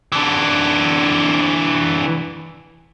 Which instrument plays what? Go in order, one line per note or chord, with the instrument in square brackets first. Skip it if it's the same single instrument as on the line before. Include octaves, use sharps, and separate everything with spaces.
[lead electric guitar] E3 D4